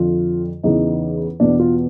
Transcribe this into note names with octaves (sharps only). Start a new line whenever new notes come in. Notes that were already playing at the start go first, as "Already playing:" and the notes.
Already playing: F2 D3 F4
E2 C#3 E3 D#4
E2 B2 D4
F4